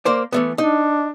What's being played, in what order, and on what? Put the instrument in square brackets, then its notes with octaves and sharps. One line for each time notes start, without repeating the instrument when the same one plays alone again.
[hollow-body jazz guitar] A#3 C5 D5
E3 A3 B3
[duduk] D4 [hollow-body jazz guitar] D#4